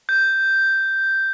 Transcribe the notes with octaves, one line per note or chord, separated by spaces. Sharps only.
G6